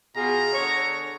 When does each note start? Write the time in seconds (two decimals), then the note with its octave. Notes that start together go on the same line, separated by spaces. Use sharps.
0.16 B2 F4 G#4 A#5
0.53 D3 G#4 C#5